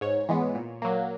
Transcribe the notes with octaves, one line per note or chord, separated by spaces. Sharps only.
G#2 C#5
E3 G#3 B3
A#2
F#3 A#3